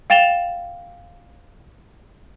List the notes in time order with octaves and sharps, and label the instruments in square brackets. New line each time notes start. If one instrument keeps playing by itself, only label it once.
[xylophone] F5 G5 A6 E7 F7 G7